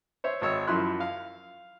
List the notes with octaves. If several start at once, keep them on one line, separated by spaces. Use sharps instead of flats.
C5 C#5 E5
G#1 C#5 E6
F#2 F3 E4 C6 F#6
F5